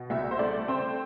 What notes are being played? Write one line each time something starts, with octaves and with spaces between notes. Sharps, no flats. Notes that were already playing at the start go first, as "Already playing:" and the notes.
Already playing: B2
C2 E5
C5
A3 D5
C4 C5